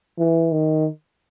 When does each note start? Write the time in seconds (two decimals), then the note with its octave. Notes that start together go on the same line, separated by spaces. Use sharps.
0.18 E3
0.52 D#3